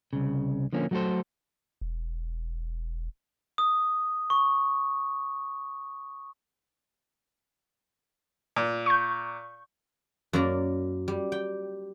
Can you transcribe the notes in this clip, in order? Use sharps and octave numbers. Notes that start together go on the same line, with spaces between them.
C2 C#3
D3 F3 A#3 C#4
F#3 A3 F#4 G4 A4 C5
E1
D#6
C#6
A#2
C#6 G6
F#2 A#3 A#4 D5 A#5
G3
G5